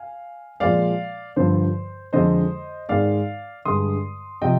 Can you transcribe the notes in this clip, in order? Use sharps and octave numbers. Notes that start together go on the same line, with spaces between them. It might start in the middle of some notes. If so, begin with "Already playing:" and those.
Already playing: F5 G#5
A#2 F3 G#3 D5 F5
G2 D3 F3 C5
F2 D3 G#3 C5 D#5
G#2 D#3 G#3 D5 F5
G2 D3 G#3 C6 D#6
C3 F3 D#5 G5